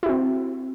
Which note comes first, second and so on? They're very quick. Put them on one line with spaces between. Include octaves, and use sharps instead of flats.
E4 F#4 C4